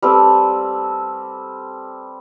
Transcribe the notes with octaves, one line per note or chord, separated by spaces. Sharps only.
G3 A3 C4